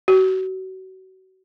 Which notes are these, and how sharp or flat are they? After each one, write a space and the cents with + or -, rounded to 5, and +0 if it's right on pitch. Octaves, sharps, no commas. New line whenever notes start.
F#4 +30